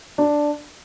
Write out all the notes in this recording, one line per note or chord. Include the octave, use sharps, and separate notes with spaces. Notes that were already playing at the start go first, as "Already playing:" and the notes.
D4